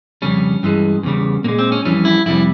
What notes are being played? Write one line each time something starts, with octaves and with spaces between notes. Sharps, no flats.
F2 C#3 G3 C#4
G2 E3 G#3
E2 C#3 G3
A#2 G#3 A#3
C4
C#4
F2 E3 G3 C#4
E4
F2 C3 G3 E4